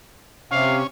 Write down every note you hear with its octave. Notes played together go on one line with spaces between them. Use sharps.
C3 C#4 F5